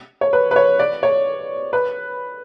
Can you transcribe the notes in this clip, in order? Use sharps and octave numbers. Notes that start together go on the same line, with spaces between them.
C#5
B4
B4
C#5
D5
C#5
B4